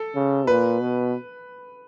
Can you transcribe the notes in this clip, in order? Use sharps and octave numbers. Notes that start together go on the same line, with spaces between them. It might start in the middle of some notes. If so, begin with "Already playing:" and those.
Already playing: A4
C#3
A#2 B4
B2